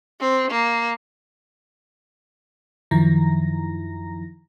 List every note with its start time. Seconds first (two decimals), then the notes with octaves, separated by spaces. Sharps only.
0.20 C4
0.51 A#3
2.91 F#2 D#3 F3 E4 A#5 A#6